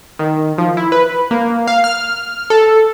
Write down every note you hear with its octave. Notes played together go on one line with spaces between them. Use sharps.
D#3
F3
E4
B4
A#3
F5
F6
A4